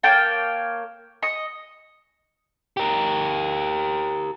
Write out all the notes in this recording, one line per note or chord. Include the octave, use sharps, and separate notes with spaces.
A#3 C#5 G5 A5
D#5 C#6
G4 A#4